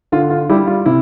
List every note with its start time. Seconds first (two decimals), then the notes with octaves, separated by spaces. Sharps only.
0.12 D3 F4
0.30 F4
0.49 G3 E4 G4
0.67 F4
0.86 C3 E4